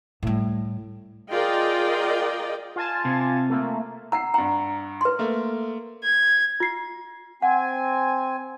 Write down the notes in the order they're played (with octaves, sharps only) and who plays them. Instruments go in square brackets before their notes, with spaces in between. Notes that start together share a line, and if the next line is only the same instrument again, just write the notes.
[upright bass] A2 G3
[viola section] F4 G#4 A#4 D5 D#5 G5
[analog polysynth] F4 G#5 A5
[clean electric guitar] C3
[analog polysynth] A3 A#3
[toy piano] F#5 A#5 [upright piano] E6 C7
[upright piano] G2 F#5 [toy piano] A#5
[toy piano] B4 C6
[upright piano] A3 A#3
[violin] G#6
[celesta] F4 C7
[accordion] C4 G#5 [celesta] F#5